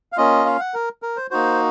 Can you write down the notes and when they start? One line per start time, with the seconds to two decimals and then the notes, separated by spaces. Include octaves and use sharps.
0.12 F5
0.17 A#3 C#4 F4 D#5
0.46 F5
0.60 F#5
0.74 A#4
1.02 A#4
1.17 C5
1.31 A#3 D#4 F#4 C5